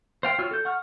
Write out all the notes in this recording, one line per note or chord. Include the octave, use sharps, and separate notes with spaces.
C5 F5 G5
F4 F#4 C#5 E6 F6
A4 G6
F#5 C#6 F6